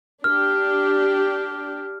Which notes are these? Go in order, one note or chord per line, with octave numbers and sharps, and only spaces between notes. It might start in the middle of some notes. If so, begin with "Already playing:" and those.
D4 G4 F6